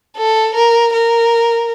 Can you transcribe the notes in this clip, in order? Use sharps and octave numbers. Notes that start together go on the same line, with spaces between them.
A4
A#4
A#4